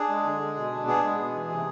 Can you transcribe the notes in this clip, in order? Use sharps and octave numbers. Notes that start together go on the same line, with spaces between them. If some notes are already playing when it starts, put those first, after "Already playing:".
Already playing: D4 G#4
G#3
D3
G#3
B2
D4
B3 G#4
G#3
B2
E3
C3